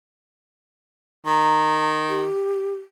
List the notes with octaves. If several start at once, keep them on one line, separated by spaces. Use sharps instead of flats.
D#3 A#5
G4